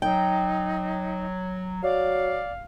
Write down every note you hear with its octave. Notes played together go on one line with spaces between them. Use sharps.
F#3 D#4 G5
F#3 D5 F5